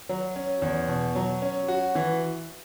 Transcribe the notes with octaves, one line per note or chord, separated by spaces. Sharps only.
F#3
C#4
E2
B2
F#3
C#4
F#4
E3